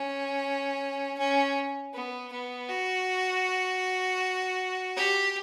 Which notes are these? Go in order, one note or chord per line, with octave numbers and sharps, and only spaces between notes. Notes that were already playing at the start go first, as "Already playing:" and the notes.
Already playing: C#4
C#4
B3
B3
F#4
G4